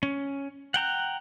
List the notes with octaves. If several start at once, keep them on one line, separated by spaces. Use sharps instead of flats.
C#4
F#5 G5 A#5 F#6